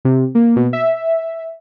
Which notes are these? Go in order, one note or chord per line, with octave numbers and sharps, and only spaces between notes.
C3
A#3
B2
E5